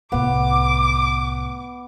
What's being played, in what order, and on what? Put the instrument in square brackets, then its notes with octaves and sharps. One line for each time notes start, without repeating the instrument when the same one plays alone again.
[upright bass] C2 A2 [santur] B3 [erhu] D6